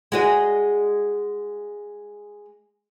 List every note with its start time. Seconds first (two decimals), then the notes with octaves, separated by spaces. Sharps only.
0.12 G#3 F#4 D#5